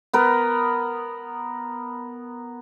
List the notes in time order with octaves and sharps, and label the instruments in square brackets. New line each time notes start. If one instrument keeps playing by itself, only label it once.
[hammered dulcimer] B3 A#4